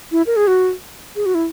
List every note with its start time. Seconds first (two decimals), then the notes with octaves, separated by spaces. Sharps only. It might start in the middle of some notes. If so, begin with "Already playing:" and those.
0.12 E4
0.27 A#4
0.36 G#4
0.47 F#4
1.16 G#4
1.26 F#4
1.35 E4